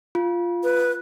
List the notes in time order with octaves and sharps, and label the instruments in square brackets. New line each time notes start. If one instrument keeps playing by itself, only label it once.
[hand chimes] F4
[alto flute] B4